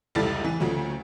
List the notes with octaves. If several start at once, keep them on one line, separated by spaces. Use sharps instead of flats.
F1 C#2 G3 E4 A4 A6
E3
D2 C#3 F3 F#3 A3